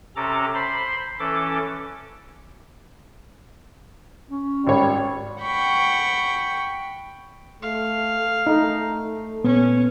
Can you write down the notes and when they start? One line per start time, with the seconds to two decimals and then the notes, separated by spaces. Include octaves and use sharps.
0.16 C3 C#4 A4 A#5 D6
0.55 C5 B5 C6
1.19 E3 C#4 A4 D6
4.31 C#4
4.67 G#1 G3 C#5
5.42 F#5 G5 B5 C#6
7.62 A3 F5
8.47 A3 D#4
9.44 A#2 B3 C#4